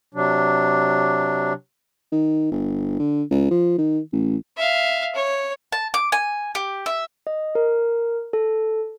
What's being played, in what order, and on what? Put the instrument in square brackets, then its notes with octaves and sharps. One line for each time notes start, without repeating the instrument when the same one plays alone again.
[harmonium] C3 F#3 D4
[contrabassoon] D#3
G1
D3
C#2
F3
D#3
A1
[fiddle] E5 F5
C#5
[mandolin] A5
D6
G#5
G4
E5
[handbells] D#5
A#4
A4